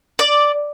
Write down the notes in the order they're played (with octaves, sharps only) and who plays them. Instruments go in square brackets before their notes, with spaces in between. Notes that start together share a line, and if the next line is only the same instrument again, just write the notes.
[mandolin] D5